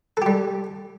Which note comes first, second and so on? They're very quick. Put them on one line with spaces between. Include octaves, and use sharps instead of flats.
A4 G4 G3